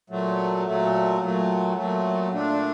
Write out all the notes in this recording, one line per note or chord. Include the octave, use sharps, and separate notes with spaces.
A#2 F#3 A3
A#2 F#3 A3
A#2 F#3 A3
A#2 F#3 A3
A#2 A3 D4